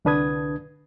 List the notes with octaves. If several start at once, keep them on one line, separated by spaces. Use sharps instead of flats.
C2 D3 D4 B4 D#6 G#6